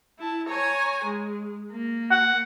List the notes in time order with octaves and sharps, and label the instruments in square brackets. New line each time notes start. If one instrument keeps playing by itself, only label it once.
[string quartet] E4 A5
C#5 G#5 A#5
G#3
A#3
[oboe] F#5